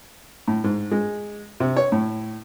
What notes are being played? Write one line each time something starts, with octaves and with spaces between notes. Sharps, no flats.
A2
G#2
G#3
C3
C#5
A2